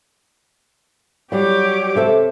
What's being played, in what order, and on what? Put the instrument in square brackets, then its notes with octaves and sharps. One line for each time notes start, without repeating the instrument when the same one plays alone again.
[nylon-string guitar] F#3 G3 [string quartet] G4 C#5 D6
[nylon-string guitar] C3 A4 E5